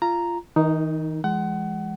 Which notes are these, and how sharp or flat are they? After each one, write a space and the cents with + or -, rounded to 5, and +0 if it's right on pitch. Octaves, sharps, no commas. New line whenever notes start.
F4 -20 A#5 +0
D#3 +45 D#4 +0 A#4 +0
E3 +45 G#3 +0 F#5 +25